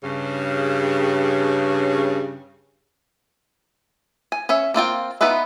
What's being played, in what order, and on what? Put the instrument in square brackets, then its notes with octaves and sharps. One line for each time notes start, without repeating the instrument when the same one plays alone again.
[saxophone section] G2 C#3
[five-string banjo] G#5
C#4 C#5 E5
A#3 C4 F4 G5
B3 D#4 F4 B4 E5